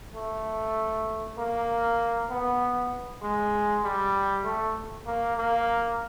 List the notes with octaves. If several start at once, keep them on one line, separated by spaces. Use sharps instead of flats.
A3
A#3
B3
G#3
G3
A3
A#3
A#3